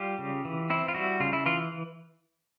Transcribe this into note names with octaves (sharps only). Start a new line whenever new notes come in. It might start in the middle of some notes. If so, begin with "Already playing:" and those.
Already playing: G3 F4 G4
C#3
E3
C4 E4
F4
G3 E4 F#4
C#3 F4
E4
E3 F4